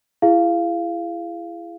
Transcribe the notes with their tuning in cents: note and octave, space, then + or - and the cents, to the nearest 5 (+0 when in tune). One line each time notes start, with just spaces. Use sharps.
E4 +30 G#4 +0 F5 -10